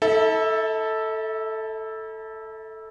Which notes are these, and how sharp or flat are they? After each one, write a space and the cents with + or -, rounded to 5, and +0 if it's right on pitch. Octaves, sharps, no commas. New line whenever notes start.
E4 -45 A4 +0 E5 +0